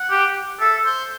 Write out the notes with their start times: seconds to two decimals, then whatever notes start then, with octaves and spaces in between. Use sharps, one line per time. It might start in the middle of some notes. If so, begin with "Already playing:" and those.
Already playing: F#5
0.10 G4
0.60 A4 E5
0.85 C5